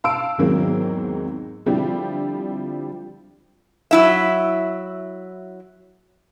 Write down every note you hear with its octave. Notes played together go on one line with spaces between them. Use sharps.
F5 A5 E6 D7
E2 G#2 D#3 F#3 A#3 C4
D3 F3 G3 C4 E4 G4
F#3 E4 E5